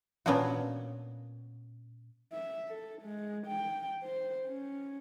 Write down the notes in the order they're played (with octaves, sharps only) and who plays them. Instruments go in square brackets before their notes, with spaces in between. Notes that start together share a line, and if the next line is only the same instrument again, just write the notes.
[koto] A#2 B3 C#4 D4 F4 F#4
[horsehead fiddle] E5
A4
G#3
G5
C5
C#4